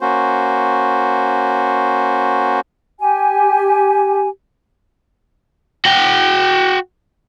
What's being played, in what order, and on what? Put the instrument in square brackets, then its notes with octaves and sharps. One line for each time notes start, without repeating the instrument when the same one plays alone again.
[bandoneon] A#3 C#4 F#4 C5
[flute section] G4 G#5
[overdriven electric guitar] F#4 G5